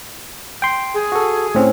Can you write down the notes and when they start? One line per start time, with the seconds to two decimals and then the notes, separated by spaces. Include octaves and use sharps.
0.62 G5 C6
0.94 G#4
1.12 F#4 A4
1.55 A2 C4 C#4